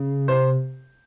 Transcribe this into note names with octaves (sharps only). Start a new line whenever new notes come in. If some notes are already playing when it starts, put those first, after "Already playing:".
Already playing: C#3
C3 C5